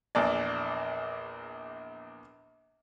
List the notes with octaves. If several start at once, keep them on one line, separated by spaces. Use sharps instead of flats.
A#1 E2 D5